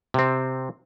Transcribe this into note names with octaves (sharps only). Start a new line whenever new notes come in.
C3 C4